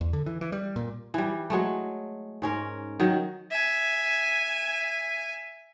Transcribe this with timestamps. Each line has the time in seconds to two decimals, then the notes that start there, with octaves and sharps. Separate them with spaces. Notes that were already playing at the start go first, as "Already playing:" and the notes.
0.01 E2
0.13 D3
0.26 E3
0.41 E3
0.52 G3
0.76 A#2
1.14 E3 G3
1.50 F#3 G#3 A3
2.42 G#2 C#4 A#4
3.00 D#3 F#3
3.51 E5 G#5